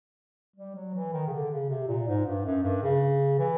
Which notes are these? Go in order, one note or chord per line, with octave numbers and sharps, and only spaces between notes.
G3
F#3
E3
D#3
C#3
D3
C#3
C3
A#2
G#2
G2
F#2
G2
C#3
E3